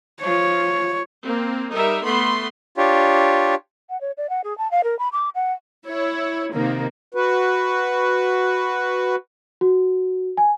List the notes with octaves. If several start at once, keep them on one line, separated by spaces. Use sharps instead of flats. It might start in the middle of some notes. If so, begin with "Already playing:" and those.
F3 F4 C#5
A#3 C4
G3 D#4 A#4 E5
A3 B3 B5 C6
D4 F4 G4 C#5
F#5
C#5
D5
F#5
G#4
A5
F5
A#4
B5
D6
F#5
E4 C#5
C3 D#3 A#3
F#4 B4
F#4
G#5